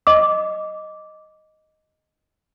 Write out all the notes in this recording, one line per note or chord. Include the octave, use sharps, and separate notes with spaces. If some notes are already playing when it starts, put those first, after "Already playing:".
D#5 D6